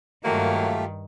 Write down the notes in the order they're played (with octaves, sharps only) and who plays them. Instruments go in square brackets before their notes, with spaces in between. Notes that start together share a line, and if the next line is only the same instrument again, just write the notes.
[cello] G2 D#3 [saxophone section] F#3 A#3 [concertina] A3 [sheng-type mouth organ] F4 G4